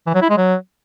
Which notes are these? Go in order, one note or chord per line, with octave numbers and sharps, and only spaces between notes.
E3
F#3
E4
G#3
F#3